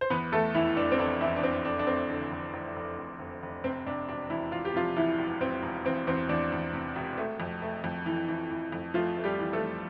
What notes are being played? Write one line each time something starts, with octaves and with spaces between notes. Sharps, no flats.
C5
E2 B3 B4
E2 A3 A4
F1 E3 E4
F1 D4
C4
F1 D4
E2 E3 E4
D4
F1 C4
F1 D4
D4
F1 C4
D3
F1
F1
F1
F1
F1
F1
C3 C4
C3 D4
E1 D4
E1 E3 E4
E1 F4
G4
C3 F3 F4
E2 E3 E4
E1
E1 C4
E1
E2 C4
E2 C4
E2 D4
E2
C3
E1
A3
F2
A3
F2
E3
E3
E3
F2
F3 A3 F4
A3
G3 G4
E3
A3 A4
E3